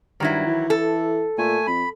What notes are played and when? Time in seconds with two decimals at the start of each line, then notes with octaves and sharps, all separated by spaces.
0.20 G2 D#3 F#3 E4
0.47 E3
0.70 A4
1.38 A#2 A3 G#5
1.67 F2 B5